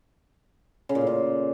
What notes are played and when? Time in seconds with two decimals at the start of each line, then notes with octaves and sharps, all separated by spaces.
0.89 C#3
0.95 A#2
1.01 A2
1.07 A#2